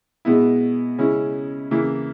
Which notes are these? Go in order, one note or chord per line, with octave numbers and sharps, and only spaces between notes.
B2 G#3 B3 E4
C#3 G#3 C#4 E4
C#3 E3 A#3 E4